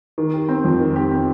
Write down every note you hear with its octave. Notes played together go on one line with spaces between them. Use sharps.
D#3
G4
C4
F2
D#3
G4
C4